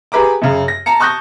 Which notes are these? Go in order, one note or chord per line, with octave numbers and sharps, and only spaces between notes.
G4 G#4 B4 A#5 D6
F#2 C#3
A#6
A5 A#5 C#7
A5 C#6 D#6 F#6 G6 A#6